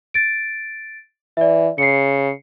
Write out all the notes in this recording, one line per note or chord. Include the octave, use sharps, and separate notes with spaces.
A6 D7
E3 D5 E5
C#3 C7 C#7